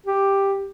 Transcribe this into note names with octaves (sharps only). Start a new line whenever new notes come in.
G4